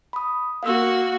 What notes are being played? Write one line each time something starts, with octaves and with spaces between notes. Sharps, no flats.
B5 D#6
A#3 F#4 F5 E6